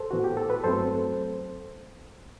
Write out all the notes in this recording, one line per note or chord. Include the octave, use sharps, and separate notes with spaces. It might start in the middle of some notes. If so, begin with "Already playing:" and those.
Already playing: A4 C5
A2 E3 B3 F#4
G4
A4
B4
G2 F#3 A3 C4 A4 C5